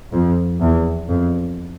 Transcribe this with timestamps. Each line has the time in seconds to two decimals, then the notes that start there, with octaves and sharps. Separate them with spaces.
0.12 F2
0.61 E2
1.08 F2